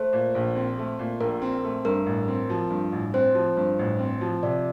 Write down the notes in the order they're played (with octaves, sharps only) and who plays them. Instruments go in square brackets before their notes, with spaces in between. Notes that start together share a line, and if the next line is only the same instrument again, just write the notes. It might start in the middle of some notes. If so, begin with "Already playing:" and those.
Already playing: [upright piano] A3 [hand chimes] C5
[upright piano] A#2
A#1
C4
A3
A#2
[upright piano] A#1 [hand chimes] A#4
[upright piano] C4
A3
[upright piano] G2 [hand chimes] A#4
[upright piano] A1
C4
F3
G2
A1
[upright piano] C4 [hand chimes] C5
[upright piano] F3
G2
A1
C4
F3
[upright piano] C3 [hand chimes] D5